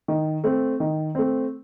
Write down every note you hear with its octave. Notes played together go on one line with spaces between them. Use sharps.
D#3
A3 C4
D#3
A3 C4